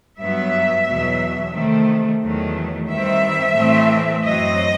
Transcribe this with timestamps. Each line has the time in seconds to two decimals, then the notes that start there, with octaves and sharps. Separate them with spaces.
0.19 G2 F#3 B3 E5
0.86 E2 B2 F#3
1.53 C3 D#3 A3 C4
2.22 E2 D#3 F#3 A3
2.89 G2 D#3 G3 C4 E5
3.56 A2 E3 A3 C4
4.23 F#2 F#3 C4 D#5